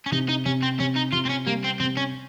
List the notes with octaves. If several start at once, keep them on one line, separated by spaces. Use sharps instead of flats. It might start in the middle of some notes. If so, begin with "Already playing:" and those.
C#4
C3 D#4
D#4
C3 C#4
C4
C3 C#4
D#4
C3 F4
C4
C#4
G3 A#3
C4
C3 C4
C#4